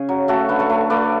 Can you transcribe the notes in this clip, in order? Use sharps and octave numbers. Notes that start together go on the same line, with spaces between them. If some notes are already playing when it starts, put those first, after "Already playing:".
Already playing: C#3 G#4
F#3
A3 F#4 A4
D3 B4
A4 C#5
A3
A3 B4 D5